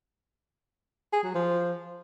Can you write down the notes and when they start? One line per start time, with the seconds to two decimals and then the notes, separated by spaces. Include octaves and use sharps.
1.13 G#4
1.24 F#3
1.35 F3